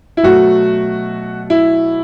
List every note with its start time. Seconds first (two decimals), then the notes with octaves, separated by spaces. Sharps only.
0.17 E4
0.23 B2 F#3 A3 F#4
1.50 E4